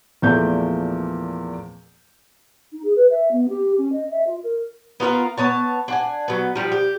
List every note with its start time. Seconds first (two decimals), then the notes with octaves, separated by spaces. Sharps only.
0.22 E2 A#2 F3 A3 A#3 G6
2.72 D#4
2.83 G#4
2.96 B4
3.11 E5
3.31 B3
3.49 G4
3.78 C#4
3.92 D#5
4.11 E5
4.27 F4
4.43 A#4
5.00 B3 F4 A#4 F5
5.38 B3 C#5 A5
5.88 D4 F#5 G#5
6.28 F#3 B3
6.56 F3 G3
6.72 G4